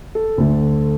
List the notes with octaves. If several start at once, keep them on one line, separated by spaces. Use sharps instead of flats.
A4
D2 D3 A3